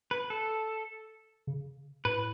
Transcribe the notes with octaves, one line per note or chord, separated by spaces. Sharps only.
B4
A4
C#3
A2 B4